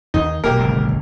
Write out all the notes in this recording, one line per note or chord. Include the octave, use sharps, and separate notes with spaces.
D#2 D#4
B1 G#3 A#3 G4 A#4
G1 C#2 A#3